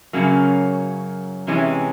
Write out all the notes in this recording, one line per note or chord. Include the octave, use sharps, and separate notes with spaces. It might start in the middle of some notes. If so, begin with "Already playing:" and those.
F#2 C#3 F#3 A#3 C#4
C3 E3 G#3 C#4